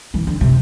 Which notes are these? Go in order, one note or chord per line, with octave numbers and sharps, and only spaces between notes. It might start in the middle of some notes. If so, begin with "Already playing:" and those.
E3
D3
C3